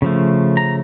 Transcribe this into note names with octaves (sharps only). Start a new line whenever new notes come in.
C#3 F3 A3
A#5